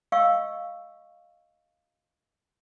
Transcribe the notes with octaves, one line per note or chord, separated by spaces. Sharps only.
D#5 F5 C#6 E6